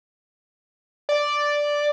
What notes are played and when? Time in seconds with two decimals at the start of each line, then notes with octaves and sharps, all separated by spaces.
1.09 D5